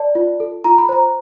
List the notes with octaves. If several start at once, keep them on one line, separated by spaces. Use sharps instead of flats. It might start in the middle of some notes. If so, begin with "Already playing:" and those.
Already playing: D5 A5
F4
A4
F4 A#5
B5
C5 A#5